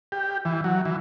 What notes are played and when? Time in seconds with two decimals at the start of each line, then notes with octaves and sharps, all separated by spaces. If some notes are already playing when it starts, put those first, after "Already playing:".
0.12 G4
0.45 E3
0.64 F#3
0.85 E3